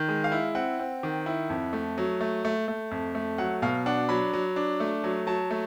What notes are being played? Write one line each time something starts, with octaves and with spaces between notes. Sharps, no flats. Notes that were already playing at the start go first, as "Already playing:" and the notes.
Already playing: D#3
G#3
F5
E4
C4 F#5
C4
D#3
E4
F2
A3
F#3
A3
A3
A3
F2
A3
F#3 F#5
B2 F5
D4 F#5
F#3 B5
F#3
D4
A3
F#3
F#3 A5
A3